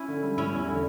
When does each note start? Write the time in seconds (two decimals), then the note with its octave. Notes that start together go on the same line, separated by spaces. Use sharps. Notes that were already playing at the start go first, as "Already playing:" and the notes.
Already playing: C#4 E4
0.08 D3
0.23 G3
0.38 G3 C#4 E4
0.53 E2
0.68 D3